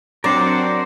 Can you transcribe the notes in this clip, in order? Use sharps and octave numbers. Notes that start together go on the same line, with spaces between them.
F#3 C4 D4 A#4 C5 D5 F#5